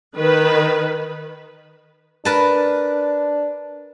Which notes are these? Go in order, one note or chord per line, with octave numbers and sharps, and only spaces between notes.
D#3 B4
D4 A#4 B4 A5